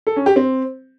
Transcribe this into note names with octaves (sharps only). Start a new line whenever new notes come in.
A4
C#4
G4
C4